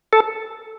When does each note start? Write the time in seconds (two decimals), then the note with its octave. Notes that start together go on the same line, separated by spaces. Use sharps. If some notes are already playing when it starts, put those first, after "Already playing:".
0.13 A4